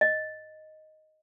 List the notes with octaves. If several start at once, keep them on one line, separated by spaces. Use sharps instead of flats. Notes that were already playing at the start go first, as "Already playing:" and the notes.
D#5